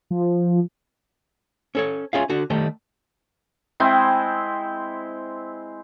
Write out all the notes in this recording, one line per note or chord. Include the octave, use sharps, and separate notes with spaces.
F3
C#4 A4 C#5
C#4 F4 G#4 E5 F5
D3 F#4
D#3 G3 A3
G#3 C4 E4 G5